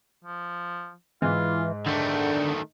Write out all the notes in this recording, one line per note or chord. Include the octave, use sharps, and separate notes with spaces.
F3
G#2 E3 F4
D3 D#3 A3 G5